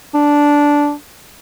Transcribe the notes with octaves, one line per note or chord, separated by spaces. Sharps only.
D4